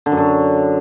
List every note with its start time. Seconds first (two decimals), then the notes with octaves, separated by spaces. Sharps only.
0.06 D3
0.12 F#2
0.17 D3